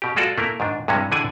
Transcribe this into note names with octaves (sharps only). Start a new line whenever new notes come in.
B2 G4
G#3 F4 F#4 A4 D5
A3 A#3 E4 A#4
G#2 D#3 D4
G2 C3 E3 G#3 C#4
D3 E3 G#4 D5 F#5 G#5